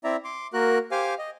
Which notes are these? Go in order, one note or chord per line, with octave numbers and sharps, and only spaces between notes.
C4 E4 D5 E5 A#5
C6 D6
A#3 F#4 A#4 F#6
G4 C5 F5 G#5 D6 F6
D#5